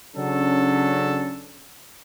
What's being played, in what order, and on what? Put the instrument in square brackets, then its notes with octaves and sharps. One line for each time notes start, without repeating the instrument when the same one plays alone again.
[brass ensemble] C#3 F#3 C#4 D4 A4